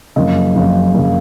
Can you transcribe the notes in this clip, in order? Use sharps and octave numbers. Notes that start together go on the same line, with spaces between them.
F#1 F2 C#3 D#5
F#1 F2 C#3
F#1 C#3